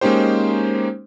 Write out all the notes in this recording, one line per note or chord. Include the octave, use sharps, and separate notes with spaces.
G#3 A#3 C#4 D#4 G4 C5